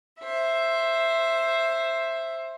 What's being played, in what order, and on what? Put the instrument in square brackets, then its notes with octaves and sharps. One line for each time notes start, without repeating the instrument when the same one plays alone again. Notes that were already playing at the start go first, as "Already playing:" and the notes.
[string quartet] C5 E5